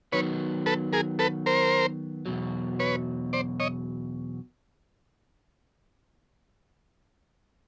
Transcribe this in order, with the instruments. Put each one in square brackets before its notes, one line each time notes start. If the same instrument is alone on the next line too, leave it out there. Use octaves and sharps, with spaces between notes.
[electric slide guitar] D#3 F#3 B3 [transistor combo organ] B4 C#5
[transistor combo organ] A4 B4
G#4 A#4
A4 B4
A#4 C5
[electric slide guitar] E2 B2 F#3
[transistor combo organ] B4 C#5
C5 D5
C#5 D#5